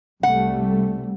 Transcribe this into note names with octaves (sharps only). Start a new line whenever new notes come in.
C2 G3 A3 F#5